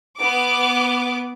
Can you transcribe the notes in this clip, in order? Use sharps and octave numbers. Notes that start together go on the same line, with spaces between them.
B3 D6